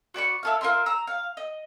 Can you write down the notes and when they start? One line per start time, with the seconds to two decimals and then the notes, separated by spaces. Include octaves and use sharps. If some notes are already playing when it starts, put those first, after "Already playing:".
0.14 F#4 D5 B5 C#6
0.43 E4 A4 F5
0.61 F4 A#4 E5 C6
0.86 A#5 E6
1.07 F5
1.37 D#5